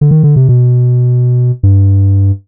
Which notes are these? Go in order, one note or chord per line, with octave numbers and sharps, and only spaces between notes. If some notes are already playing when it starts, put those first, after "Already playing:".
D3
D#3
D3
C3
B2
G2